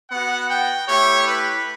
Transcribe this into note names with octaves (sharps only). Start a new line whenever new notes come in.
B3 F#4 F#5
G5
A3 E4 G4 C#5
B4